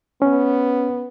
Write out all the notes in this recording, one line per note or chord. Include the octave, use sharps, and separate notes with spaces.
B3 C#4